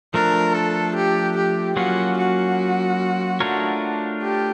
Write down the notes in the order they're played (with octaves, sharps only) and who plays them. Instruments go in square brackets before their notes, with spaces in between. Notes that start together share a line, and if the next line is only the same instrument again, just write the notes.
[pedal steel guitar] F3 A3 D4 [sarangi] A#4
[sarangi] A4
G4
G4
[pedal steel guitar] F#3 A#3 C#4 F4 [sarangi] F#4
[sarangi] F#4
[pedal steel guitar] A3 D4 F4 A#4 C#5
[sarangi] G4